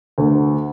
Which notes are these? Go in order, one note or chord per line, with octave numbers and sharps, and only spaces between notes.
D2